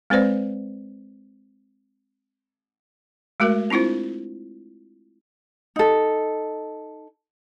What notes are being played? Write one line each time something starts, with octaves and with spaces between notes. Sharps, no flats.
G#3 C4 B4 C5 D5
G#3 A3 F#4 A#4
C4 D4 E4 F4 C5
D#4 A4